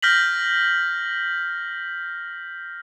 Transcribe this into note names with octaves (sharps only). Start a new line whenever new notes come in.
F6 G6 A#6 B6 F#7